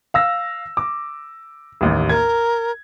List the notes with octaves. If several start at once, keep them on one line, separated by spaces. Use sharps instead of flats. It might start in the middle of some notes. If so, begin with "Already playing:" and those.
F5 E6 A#6
D6
A1 D#2
A#4 G#6